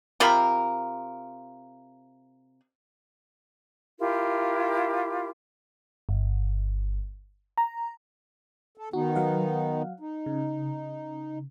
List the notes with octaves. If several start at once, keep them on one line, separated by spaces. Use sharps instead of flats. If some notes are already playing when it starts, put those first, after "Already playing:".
C3 F4 A#4 B5
E4 F4 G4 A#4
G1
A#5
A4
D#3 B3 D#4 F#4
F#3 F5 F#5
D#4
C#3